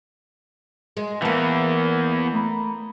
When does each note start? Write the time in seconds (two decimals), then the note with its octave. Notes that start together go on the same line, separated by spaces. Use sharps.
0.97 G#3
1.22 E2 E3 A#3 B3 G#5 A5 C#7
2.34 A3 A#5 B5